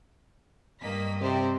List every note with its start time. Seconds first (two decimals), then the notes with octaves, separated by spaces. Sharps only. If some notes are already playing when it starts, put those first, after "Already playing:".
0.80 G2 A#3 D#5 B6
1.21 C3 G4 C5 D5